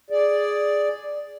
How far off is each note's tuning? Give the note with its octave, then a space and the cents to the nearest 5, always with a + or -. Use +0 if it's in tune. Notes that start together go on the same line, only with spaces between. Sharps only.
G#4 +0 D5 +0